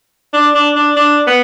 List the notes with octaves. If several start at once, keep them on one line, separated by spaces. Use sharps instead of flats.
D4
D4
D4
D4
B3